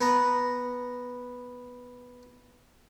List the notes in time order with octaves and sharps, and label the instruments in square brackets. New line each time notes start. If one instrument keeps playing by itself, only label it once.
[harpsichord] B3 A#5